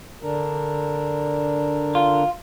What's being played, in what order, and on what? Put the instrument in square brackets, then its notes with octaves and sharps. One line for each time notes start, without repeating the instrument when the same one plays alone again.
[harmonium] D3 D4 A#4
[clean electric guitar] F4